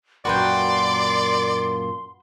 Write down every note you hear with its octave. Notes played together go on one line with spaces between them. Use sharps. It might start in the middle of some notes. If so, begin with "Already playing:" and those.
F#2 A#2 A#3 F#4 B4 D5 G5 C6